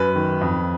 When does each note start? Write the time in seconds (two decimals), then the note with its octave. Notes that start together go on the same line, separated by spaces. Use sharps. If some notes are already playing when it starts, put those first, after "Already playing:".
Already playing: F#2 B4
0.15 D#3
0.41 F2